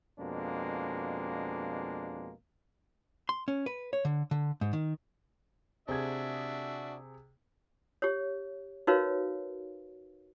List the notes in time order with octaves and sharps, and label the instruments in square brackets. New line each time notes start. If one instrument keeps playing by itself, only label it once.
[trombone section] F2 B2 G#3 A#3 D4
[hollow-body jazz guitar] C6
C#4
B4
C#5
D3
D3
G#2
D#3
[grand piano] C3 G#4 G#6 [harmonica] D4 F#4 E5
[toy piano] G4 C#5
D#4 F#4 A#4 B4 C#5 F5